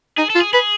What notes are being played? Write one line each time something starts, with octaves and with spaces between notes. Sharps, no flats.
D#4 G#4
A4
F4
G#4
G#4 B4